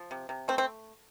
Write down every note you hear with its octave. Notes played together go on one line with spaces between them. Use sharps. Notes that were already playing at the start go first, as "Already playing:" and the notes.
Already playing: F3
C3
C3
A3 C4
C4